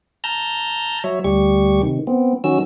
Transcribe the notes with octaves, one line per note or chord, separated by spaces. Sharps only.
A5 A#5 F6 G6 A#6
F#3 C#5 E5
D2 G3 G4 C#6
C3 D#3
B3 C4
D#3 F#3 C#4 F#4 E6